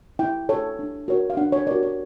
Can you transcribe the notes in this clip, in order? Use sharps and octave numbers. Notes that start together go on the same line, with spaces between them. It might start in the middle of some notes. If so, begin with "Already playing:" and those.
E4 G5
A4 C#5
D4
F#4 A#4 C#5
F5
D4 F#5
C#5
F#4 A#4 C#5 D5
C#5